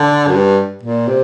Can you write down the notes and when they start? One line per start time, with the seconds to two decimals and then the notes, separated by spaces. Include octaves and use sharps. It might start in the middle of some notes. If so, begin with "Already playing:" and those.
Already playing: D3
0.28 F#2
0.34 G2
0.83 A#2
1.08 C3